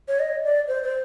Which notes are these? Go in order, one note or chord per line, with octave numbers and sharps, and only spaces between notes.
C#5
D#5
D5
C5
C5